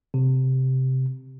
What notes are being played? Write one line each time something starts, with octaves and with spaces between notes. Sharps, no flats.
C3